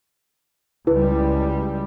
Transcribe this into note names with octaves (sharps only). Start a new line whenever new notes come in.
C#2 G3 E4 B4